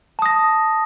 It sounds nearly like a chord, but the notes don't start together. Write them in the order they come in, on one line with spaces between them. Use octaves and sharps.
A5 D#6 A#6